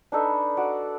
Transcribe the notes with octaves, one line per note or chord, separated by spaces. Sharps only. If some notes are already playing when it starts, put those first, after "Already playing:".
D4 D#4 A4 B4
F#4 D5